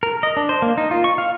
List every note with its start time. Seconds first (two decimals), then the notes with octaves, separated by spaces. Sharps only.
0.03 A#4
0.23 D#5
0.37 D4
0.49 C5
0.62 A#3
0.78 D#4
0.91 F4
1.04 C#6
1.18 F5